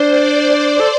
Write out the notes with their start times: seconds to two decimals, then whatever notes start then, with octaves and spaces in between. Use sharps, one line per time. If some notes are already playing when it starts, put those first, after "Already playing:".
Already playing: D4 C5
0.12 D5
0.51 C5
0.80 A4